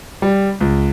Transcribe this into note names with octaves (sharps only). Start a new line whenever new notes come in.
G3
C#2